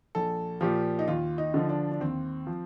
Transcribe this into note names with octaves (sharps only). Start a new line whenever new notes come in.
A#1 A4
A#2 F3 G4
D#4
D#2 F4
D#4
D3 F3
D4
D4
D#2 C4
F3